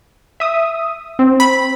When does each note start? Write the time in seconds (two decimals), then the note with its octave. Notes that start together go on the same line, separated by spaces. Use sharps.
0.40 E5 D#6
1.19 C4
1.40 B5